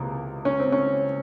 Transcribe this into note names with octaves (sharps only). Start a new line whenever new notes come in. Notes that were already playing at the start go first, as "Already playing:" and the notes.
Already playing: C#2 C3 E3 A#3
C#4
C4
C#4